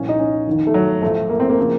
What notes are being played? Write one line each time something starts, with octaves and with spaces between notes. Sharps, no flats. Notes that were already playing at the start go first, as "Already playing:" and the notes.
Already playing: C2 A#2 F3 C#4
D#4
C#4
F1 D#2 D#3
A3
F#3
A1 A2 F3 A3
A#3
C4
A#3
C#3 F3